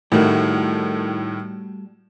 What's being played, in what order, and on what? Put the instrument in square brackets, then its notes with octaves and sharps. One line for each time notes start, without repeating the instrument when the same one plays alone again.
[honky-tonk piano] A2 D#3 [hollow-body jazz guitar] G3 A3 F#4